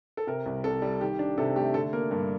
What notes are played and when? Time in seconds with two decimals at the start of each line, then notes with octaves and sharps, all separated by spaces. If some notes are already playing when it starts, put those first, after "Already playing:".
0.17 A4
0.27 C3 A#4
0.46 C2
0.64 C2 A4
0.82 G3
1.00 D#3 G4
1.19 D4
1.38 C3 A4
1.56 A3 G4
1.74 D3 A4
1.93 A#3 A#4
2.11 G2 A#4